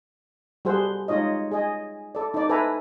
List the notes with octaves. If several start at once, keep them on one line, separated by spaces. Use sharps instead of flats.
G3 F#4 G#4 A4 C5 F#5
G#3 D#4 F4 C#5 D#5
G#4 D#5 G#5
A4 D5
D#4 D5
A4 B4 C5 E5 G#5 A#5